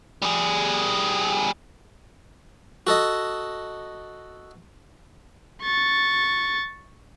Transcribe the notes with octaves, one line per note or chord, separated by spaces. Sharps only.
G3 G#4
F#4 A4 D#5
C#6 A6